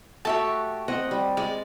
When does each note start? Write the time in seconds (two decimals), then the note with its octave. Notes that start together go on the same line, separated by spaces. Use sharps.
0.25 A3 F#4 G4 E5 A5
0.88 C4 D#5 F#5
1.11 G3
1.37 G#3 D5